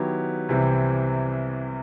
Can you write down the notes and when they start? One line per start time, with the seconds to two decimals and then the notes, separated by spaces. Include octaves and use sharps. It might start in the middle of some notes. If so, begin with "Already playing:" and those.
Already playing: D#3 F#3 B3 E4 G4
0.49 C2 C3 E3 G3 C4